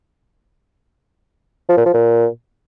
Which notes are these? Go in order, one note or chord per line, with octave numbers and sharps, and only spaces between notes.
F3
A#2
F3
A#2